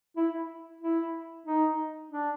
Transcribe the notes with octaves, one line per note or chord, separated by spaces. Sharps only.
E4
E4
D#4
D4